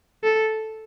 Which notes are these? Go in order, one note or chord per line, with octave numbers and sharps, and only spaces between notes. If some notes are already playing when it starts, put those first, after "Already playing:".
A4